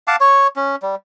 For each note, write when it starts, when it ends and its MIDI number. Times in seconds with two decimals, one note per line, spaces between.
0.08 0.16 77
0.08 0.16 78
0.08 0.16 81
0.08 0.16 86
0.21 0.47 73
0.21 0.47 85
0.56 0.76 61
0.83 0.95 55